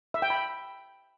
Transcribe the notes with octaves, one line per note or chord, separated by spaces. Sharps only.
E5
G5
B5